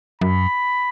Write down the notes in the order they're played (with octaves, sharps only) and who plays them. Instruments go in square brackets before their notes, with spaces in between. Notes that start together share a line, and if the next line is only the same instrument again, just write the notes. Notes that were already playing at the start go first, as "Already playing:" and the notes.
[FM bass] F#2 [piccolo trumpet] B5